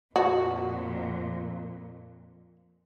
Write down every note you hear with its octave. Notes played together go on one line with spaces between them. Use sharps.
F2 A#2 F#4